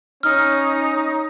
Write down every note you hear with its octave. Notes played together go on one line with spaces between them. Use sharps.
C#4 D#4 F6